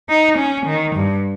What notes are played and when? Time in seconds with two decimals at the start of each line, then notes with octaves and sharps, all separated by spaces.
0.09 D#4
0.38 C#4
0.66 D#3
0.95 G2